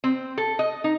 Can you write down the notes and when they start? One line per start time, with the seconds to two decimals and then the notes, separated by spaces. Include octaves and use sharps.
0.04 C4
0.38 A4
0.59 D#5
0.84 D#4